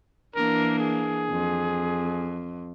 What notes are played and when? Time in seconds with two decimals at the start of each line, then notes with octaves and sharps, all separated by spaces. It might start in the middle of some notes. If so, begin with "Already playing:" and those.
0.35 E3 A#3 D4 A#4
0.79 G#4
1.30 F2